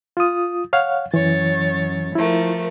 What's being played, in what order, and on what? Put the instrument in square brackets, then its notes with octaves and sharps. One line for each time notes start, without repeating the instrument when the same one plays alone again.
[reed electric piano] F4 D#6
C#5 F5 F#5
[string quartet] F#2 C#5 A6 [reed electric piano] E3
[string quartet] F3 A3 A#4 [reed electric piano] E4